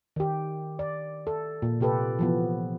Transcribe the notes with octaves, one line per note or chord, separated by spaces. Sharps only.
D#3 G4
D5
A4
A#2
C3 F4 G4 A4 B4
E3 F3 B3